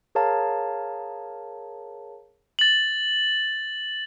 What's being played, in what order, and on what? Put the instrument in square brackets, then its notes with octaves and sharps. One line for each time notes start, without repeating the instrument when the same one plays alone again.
[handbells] G#4 A#4 C#5 F5 A5 A#5
[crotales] A6 F#7